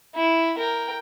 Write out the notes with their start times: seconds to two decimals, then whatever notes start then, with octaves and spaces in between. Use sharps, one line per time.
0.15 E4
0.58 A#4 G5